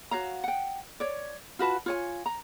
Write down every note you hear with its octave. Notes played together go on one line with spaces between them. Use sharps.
F#4 C#5 F5 A#5
F#5 G5
C#5 D5
F4 F#4 B4 A5
F4 C#5 G#5
A#5